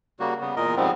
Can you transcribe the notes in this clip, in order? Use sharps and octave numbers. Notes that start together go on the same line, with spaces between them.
C#3 G3 A#3 F#4
C#3 G3 B3
E2 A#2 A#4 D#5
G#2 C#3 F3 G3 B3 C4